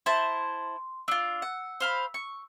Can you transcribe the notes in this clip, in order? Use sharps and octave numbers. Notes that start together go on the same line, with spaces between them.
E4 C5 A5 C6
D4 F4 E6
F#5
C5 F5 B5
C#6